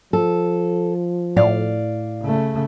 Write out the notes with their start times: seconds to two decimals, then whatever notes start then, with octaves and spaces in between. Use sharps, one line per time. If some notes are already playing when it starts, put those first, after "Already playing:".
0.13 F3 A4
1.36 A2 D5 F5
2.22 C#3 A3